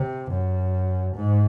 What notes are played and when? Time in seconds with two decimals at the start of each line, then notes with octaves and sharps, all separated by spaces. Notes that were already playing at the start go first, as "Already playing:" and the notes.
Already playing: C3
0.32 F#2
1.16 G#2